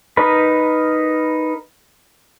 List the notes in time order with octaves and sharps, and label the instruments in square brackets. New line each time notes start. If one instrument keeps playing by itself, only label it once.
[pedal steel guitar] D#4 A#4 B4 B5